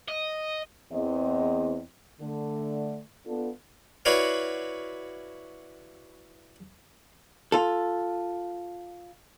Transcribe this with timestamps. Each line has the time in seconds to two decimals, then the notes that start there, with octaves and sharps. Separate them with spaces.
0.08 D#5
0.92 E2 C4 D#5
2.22 D3 A3
3.26 B3 D4 F4 A4
4.05 E4 F#4 B4 C#5 D5 F5
7.52 F4 A4